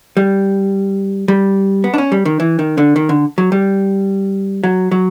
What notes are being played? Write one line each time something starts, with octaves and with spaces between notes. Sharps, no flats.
G3
G3
B3
D4
C#4
G3
D#3
E3
D#3
D3
D#3
D3
F#3
G3
F#3
F#3